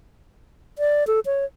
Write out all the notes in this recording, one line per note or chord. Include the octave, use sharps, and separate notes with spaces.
D5
A4
C#5